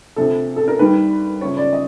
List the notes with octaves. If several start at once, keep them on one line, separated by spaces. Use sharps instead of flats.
D2 C3 F3 A4
A4
A#4
D#2 D#3 G3 B4
F#2 C#3 F3 C#5
D5
D#5